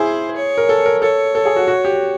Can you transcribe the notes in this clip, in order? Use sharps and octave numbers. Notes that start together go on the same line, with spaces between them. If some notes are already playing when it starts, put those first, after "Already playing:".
Already playing: E4 G#4 C5
C#5
A#4
A4
A#4
A4 C#5
A4
G#4
F#4
F#4
G4